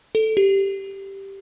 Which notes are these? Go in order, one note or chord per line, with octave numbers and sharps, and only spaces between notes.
A4
G4